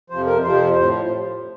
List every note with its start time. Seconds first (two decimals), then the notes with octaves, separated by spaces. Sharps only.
0.10 F2 C3 F3 C5
0.26 A#4
0.43 F2 C3 F3 C5
0.75 A2 F3